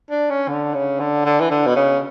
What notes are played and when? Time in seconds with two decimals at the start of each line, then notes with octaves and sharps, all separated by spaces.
0.10 D4
0.30 C#4
0.48 D3
0.74 C#3
0.99 D3
1.25 D3
1.40 E3
1.51 D3
1.66 B2
1.76 C#3